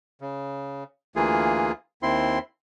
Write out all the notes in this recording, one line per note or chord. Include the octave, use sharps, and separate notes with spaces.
C#3
D2 E3 A#3 F4 G#4
D#2 C4 E4 C6